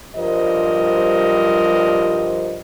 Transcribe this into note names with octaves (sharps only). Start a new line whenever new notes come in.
G2 F3 G3 A#4 C5 D#5